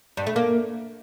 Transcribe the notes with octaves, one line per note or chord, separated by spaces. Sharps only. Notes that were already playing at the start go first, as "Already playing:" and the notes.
G2
A3
A#3